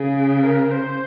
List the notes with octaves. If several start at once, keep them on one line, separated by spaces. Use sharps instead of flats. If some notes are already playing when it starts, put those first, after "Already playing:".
Already playing: C#3 G#4
A#4
C5